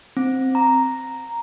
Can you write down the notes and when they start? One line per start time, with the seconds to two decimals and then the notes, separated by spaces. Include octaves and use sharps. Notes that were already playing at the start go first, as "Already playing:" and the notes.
0.17 C4
0.55 A#5